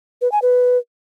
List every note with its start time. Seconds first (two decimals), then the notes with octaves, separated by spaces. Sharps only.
0.22 B4
0.32 G#5
0.42 B4